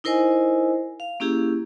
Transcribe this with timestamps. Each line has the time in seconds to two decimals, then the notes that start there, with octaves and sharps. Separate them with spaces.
0.04 D#4 E4 A#4 C5 D#5 G#5
1.00 F5
1.20 A#3 C#4 E4 G4 G#4